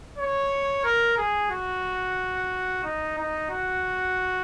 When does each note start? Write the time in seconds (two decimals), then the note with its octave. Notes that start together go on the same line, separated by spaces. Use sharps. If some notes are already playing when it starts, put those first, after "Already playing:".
0.18 C#5
0.84 A#4
1.17 G#4
1.51 F#4
2.84 D#4
3.18 D#4
3.50 F#4